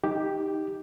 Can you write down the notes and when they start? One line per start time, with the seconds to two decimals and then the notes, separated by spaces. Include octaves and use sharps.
0.04 D#4 G4